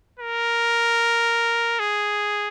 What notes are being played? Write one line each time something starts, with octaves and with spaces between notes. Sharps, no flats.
A#4
G#4